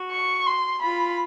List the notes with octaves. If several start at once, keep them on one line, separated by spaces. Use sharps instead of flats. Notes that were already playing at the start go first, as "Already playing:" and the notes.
Already playing: F#4
C#6
C6
F4 B5